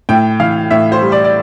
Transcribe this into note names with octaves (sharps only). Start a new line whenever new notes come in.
A2 G5
E3 F5
A2 E5
C5
G3
D5
D5